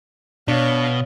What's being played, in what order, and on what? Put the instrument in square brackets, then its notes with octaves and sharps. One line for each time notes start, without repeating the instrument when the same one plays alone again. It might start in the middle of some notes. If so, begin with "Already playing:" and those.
[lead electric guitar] B2 [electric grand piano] D4 [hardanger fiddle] C#5 F5